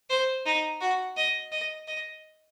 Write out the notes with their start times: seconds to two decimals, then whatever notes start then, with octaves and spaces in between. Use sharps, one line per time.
0.10 C5
0.46 D#4
0.81 F#4
1.17 D#5
1.52 D#5
1.87 D#5